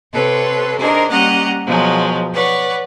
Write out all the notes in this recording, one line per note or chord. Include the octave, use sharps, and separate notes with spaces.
C3 A4 B4 C#5 C6
D4 D#4 G#4 A#4 C5
G3 A#3 C#4 D#5 F#5 A#5
B2 F3 F#3 G#3
B4 C#5 D5 F#5